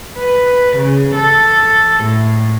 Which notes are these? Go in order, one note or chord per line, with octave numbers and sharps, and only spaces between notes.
B4
C#3
A4
A2